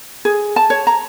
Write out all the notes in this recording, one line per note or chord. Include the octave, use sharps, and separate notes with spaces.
G#4
A5
C#5
A#5